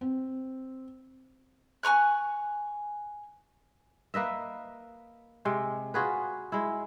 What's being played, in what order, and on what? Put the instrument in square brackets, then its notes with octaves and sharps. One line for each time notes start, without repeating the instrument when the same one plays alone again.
[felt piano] C4
[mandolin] G#5 A#5 C#6 F#6
[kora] A#3 B4 D#5 E5
C3 G#3
F4 F#4 G#4 B4
G#3 E4